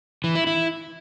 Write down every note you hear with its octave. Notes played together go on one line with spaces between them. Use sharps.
E3
E4
E4